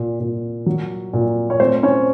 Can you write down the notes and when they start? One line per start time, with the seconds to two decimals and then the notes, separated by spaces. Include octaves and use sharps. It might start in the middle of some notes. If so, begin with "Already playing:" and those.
Already playing: A#2
0.20 A#2
0.66 F#3
1.13 A#2
1.50 C#5
1.59 A3 C4 C5
1.83 C#4 C#5